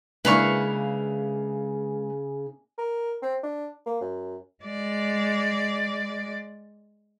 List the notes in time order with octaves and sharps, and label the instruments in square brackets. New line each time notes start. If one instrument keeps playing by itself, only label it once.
[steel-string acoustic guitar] C#3 [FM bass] G#3 [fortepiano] A#3 D4 E4 [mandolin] B4 F5 C#6
[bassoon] A#4
C4
D4
A#3
F#2
[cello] G#3 D5